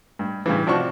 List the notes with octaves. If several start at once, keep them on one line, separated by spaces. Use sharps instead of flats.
G2
G2 C#3 E3
C3 F3 D4 F#4 C#6